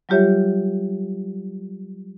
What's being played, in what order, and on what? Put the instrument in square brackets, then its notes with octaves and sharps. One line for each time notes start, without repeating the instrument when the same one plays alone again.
[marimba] F#3 G3 F4 G4 C#5 E5